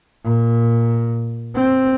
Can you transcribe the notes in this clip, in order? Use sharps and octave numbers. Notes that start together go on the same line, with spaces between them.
A#2
C4